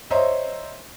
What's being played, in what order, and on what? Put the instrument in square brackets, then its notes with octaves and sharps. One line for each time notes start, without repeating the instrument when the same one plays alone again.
[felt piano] C5 C#5 D#5 E5 A#5 C6